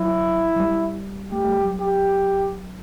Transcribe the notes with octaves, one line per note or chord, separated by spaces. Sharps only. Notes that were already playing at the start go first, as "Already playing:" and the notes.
Already playing: F#3 E4
F#3
G3
A3 G4
A3
G3
F#3
G4